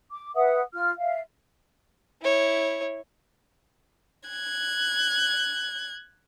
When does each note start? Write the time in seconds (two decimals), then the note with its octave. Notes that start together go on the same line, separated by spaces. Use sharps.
0.10 D6
0.35 B4 E5 F#5 D#6
0.73 F4 F6
0.99 E5 F5
2.22 E4 C#5
4.29 F#6 G#6